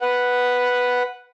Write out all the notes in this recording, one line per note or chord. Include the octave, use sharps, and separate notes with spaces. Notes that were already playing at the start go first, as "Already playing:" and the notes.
B4 F#5